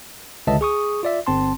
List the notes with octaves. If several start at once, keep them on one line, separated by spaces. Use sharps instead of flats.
C#2 D3 B4 D#5 E5 A5
G#4 C#6 D#6
F4 D5 E5
G1 C4 A5 C6